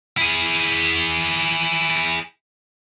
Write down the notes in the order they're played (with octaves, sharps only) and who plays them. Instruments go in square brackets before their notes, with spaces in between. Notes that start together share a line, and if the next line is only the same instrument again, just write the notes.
[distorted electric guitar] E4 G#4